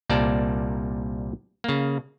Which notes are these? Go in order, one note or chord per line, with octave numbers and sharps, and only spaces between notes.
C2 A#2 G3 A#3 D5 A5
C#3 A#3